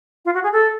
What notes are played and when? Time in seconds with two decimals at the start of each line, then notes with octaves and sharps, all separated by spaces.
0.25 F4
0.34 F#4
0.43 G#4
0.52 A4